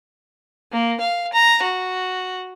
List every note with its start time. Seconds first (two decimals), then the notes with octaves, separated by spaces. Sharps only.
0.72 A#3
1.00 F5
1.33 A#5
1.63 F#4